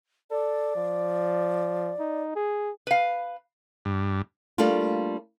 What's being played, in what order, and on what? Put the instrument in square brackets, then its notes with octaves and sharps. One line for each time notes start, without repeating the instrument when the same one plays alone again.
[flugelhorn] A4 [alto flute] D5
[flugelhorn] F3
D#4
G#4
[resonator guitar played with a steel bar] B4 F5
[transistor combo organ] G2
[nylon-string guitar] G3 A3 A#3 D4 F4